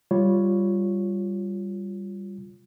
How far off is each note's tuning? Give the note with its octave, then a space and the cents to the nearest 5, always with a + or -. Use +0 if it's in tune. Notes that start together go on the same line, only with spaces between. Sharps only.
G3 +0 F4 +0 C#5 +0